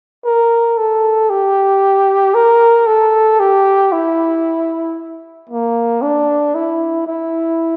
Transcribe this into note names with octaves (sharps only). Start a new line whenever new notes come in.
A#4
A4
G4
A#4
A4
G4
E4
A#3
D4
E4
E4